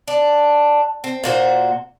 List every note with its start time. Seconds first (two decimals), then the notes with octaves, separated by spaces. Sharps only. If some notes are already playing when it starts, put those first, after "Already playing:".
0.08 D4
1.04 C4
1.24 A#2 F#4 C5